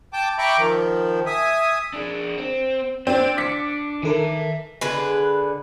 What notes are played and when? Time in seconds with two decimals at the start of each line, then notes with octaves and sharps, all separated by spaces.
0.13 G5 A5 D6
0.38 E5 G5 A#5 B5 C#6 D6
0.58 D#3 F3
1.26 E5 G#5 D#6
1.93 D4 G#4
2.38 C4
3.07 C4 D4
3.37 D6 B6 C#7
4.03 D#3 A4 A#4 E5 G#5
4.81 D3 G#4 B4